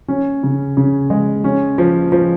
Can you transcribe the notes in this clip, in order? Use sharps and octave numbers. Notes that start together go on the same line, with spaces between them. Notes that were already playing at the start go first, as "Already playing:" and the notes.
C#4
C#3
C#3
G#3
C#4
F3
F3